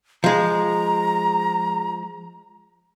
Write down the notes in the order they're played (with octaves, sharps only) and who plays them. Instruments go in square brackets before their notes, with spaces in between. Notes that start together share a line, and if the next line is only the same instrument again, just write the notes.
[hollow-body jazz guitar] F3 G#3 [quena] A#5